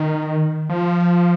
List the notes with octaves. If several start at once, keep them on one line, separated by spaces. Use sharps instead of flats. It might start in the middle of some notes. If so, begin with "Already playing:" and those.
Already playing: D#3
F3